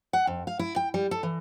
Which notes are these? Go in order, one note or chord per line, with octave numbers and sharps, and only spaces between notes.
F#5
F2
F5
E4
G5
G3
A4
E3